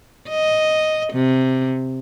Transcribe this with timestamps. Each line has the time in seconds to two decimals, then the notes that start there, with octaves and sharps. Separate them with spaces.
0.29 D#5
1.13 C3